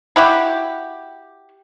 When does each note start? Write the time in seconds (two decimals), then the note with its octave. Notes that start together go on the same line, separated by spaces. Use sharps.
0.16 E4 F#4 G4